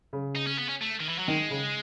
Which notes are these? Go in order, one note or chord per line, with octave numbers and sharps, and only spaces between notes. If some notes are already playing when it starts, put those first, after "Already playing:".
C#3
D#4
C#4
B3
C#4
A3
D#3
E3
F#3
D#3 G#3
C#3